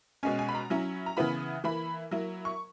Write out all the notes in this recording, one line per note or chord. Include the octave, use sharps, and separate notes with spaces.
B2 G#3 C#4 G#5
G#5
B5
A#5
F#3 C#4 E4
A#5
C#3 E3 B3 E4 B5
E3 A#3 E4 B5
F#3 A#3 E4
C#6